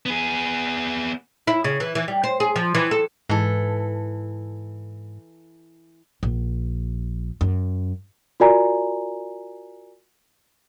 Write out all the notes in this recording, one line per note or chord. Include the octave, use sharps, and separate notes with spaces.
B3 G#4
E4
C#3
E3
E3
G3
C5
G#4
F3
E3
A4
G#2 E3 A4
A#1
F#2
F4 F#4 A#4 D5 G#5 A#5